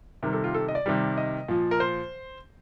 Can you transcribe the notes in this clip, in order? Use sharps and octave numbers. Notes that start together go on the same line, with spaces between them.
C3 D#3 G3 A#4
A4
F4
A4
D#5
D5
C3 D#3 G3
D#5
A#2 F3
A#4
C5